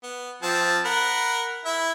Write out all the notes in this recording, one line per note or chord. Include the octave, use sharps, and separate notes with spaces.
B3
F3 C4 A5
A#4 F#5 B5
E4 E5